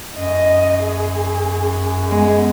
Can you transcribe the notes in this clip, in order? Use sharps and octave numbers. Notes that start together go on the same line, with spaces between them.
F#2 D#5
G#4
G#3 B3